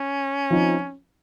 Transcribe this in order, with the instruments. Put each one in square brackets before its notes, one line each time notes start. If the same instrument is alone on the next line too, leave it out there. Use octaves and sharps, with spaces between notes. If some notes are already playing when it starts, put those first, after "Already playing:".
Already playing: [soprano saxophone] C#4
[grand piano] F3 C4 D#4